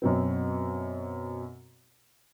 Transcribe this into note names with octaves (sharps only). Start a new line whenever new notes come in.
F#2 B2 C4